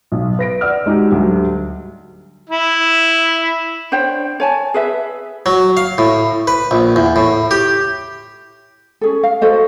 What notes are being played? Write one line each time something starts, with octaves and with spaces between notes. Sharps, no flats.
B1
B4 A#6 D7
D5 F#5 E6 F6
G#3 D#4 F#4 G4
D2 F#3 G3
E4
D4 C5 C#5 G5
C#5 G#5 A5
G#4 B4 E5
F#3
F5
A2
B4
A#1
E2
A2
G4
C#4 G#4 A4
F5
F#4 A4 C5 D#5